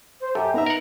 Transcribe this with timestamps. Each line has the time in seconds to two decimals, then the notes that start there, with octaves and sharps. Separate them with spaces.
0.20 C5
0.35 F#2 G4 A4
0.54 B3 D#4 E5 A#5
0.66 A#4 F#5